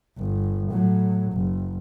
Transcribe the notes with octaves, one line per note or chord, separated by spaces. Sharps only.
G1
A2 F#3
F#1